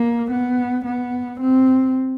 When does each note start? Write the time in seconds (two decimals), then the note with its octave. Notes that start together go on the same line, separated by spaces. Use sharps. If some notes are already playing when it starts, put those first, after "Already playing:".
Already playing: A#3
0.32 B3
0.86 B3
1.41 C4